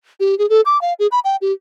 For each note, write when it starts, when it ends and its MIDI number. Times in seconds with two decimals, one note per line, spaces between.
0.20 0.37 67
0.39 0.48 68
0.50 0.61 69
0.66 0.80 86
0.81 0.93 77
0.99 1.07 68
1.12 1.19 83
1.24 1.36 79
1.41 1.52 67